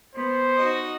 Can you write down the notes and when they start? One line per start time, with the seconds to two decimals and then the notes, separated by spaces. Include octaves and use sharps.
0.15 B3 C5
0.55 D#4 F#4 D#5